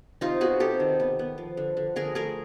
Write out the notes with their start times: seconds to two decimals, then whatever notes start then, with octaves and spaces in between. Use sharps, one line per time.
0.21 C3 D#4 F4
0.41 B3 F#4 G#4
0.60 C3 G4 A4
0.80 D#3
1.00 B3
1.19 B3
1.38 F3
1.57 D3
1.77 D3
1.96 D3 G#4 A#4
2.15 A3 G#4 A#4